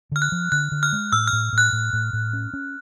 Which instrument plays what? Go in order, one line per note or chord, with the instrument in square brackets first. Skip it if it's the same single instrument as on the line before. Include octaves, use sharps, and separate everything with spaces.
[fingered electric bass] D3 [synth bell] F6
[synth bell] F#6
[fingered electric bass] F3
[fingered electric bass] D3 [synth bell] F#6
[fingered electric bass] D3
[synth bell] F6
[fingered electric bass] G#3
[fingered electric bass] A2 [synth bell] E6
[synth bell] F6
[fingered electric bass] A2
A2
[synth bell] F#6
[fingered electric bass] A2
A2
A2
C#4
C#4